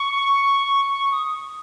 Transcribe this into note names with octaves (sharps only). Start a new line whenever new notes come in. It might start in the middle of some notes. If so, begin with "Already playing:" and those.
Already playing: C#6
D#6